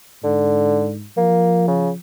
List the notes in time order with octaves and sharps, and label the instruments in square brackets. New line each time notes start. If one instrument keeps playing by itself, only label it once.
[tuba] G#2 [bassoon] D3
[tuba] F3 [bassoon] A#3
[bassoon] C#3